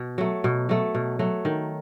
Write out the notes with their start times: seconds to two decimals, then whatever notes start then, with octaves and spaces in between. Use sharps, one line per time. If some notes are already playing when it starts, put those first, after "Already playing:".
Already playing: B2
0.18 F#3 A3
0.44 B2
0.69 F#3 A3
0.95 B2
1.19 F#3 A3
1.45 D#3